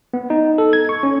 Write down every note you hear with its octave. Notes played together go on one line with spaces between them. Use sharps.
B3
D#4
A4
G#6
C#6
C#4